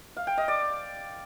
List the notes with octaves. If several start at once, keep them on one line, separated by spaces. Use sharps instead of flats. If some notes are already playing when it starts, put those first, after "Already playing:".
F5
G5
D#5
D5